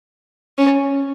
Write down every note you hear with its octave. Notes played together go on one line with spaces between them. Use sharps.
C#4